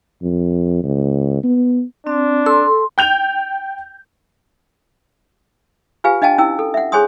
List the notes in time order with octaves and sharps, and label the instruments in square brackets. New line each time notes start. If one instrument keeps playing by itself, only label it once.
[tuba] F2
C#2
B3
[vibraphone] C4 [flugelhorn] D4
[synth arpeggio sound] A4 [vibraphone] C6
[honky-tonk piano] G5 G6 F7
[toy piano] F4 G4 B4 F5 G#5
D4 D#5 F5 G5 A5
C#4 E4 G5 E6
A4
E5 F#5
G#4 C5 C#5 G#5 C6 D#6